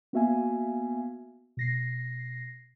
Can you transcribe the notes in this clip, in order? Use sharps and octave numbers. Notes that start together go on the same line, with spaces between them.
A#3 B3 F#4 E5 F5 G#5
B2 A#6 C7